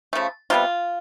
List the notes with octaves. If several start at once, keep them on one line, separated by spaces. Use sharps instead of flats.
C#3 F3 A3
C3 E3 G3 B3 F4